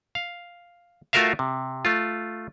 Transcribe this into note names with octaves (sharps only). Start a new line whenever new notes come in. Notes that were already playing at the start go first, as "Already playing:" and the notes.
F5
A3 F4 F#4 A#4 E5 F5
C3
A3 F4